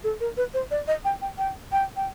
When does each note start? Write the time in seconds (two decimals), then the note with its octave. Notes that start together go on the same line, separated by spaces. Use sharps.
0.04 A4
0.20 A#4
0.37 B4
0.54 C5
0.71 D5
0.88 D#5
1.05 G5
1.22 G5
1.38 G5
1.72 G5
1.97 G5